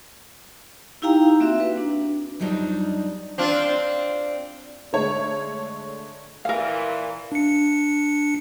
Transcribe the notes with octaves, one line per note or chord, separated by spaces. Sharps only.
D#4 E4 G4 F5 G5 A#5
A#3 C4 F#4 E5
B4
D4
F2 F#3 G3 D4 D#4
C4 D4 F4
D3 G#3 A3 C#5
A#2 E3 A#4 F5
D4 C#7